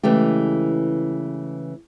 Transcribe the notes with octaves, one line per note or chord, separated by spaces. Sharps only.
C#3 E3 G#3 A3 G4